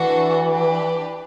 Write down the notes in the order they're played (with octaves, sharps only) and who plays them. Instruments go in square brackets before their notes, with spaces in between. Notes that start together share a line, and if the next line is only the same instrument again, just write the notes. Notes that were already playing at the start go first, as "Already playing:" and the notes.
Already playing: [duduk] E3 [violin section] A3 D4 F#4 A4
[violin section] D4 G4 B4